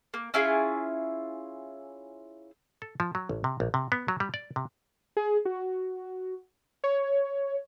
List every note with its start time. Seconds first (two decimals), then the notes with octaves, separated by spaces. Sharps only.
0.14 A#3
0.34 C#4 E4 F4 G#4
2.82 A4
3.00 F3
3.15 F#3
3.29 A1
3.44 C3
3.60 A#1
3.74 C3
3.92 B3
4.08 F#3
4.20 G3
4.34 D5
4.56 C3
5.17 G#4
5.45 F#4
6.84 C#5